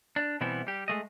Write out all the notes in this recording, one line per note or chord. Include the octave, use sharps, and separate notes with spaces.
D4
B2 E3 G3 B3 C4 E4
G3 G4
G#3 A3 D#5